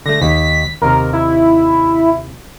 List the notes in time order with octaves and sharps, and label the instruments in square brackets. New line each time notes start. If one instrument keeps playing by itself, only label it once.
[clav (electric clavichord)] D3 A3 [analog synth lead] A#6
[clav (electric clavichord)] D#2 [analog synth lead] B6
[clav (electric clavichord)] D#2 C3 [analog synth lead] A#4
[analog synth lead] E4